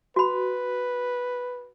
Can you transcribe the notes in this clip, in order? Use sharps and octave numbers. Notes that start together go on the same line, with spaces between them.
F#4 B4 B5